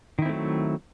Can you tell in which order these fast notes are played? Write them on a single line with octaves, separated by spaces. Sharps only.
D#3 E4 C4 A3 F#3